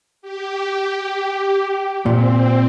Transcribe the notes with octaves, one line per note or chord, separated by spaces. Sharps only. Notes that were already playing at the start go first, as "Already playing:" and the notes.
G4
A#2 C4